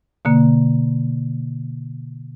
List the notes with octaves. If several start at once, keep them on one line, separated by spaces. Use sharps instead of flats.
B2 D3 A#3